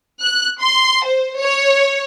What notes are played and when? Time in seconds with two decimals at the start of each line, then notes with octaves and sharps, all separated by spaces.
0.22 F#6
0.61 C6
1.03 C5
1.39 C#5